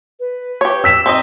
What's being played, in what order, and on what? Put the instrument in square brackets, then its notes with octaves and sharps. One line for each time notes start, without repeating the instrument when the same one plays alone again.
[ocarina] B4
[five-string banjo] G4 C#5
[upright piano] E6 B6 E7
[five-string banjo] C4 D#4 D#5